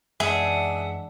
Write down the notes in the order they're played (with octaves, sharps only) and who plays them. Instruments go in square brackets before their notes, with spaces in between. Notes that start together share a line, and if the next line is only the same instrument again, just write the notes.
[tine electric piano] F#2 E3 G#3 [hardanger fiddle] D4 F#5 [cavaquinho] G#4 [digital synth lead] E5